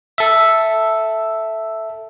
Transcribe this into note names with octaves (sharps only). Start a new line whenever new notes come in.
A4 E5